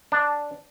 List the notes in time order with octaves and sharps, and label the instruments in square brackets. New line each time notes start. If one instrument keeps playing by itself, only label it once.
[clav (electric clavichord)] D4